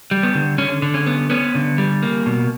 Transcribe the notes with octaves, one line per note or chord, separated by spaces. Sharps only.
G3
B3
D3
D3 C#4
D3
C#4
B3
B3 C#4
D3
G3
A#3
B2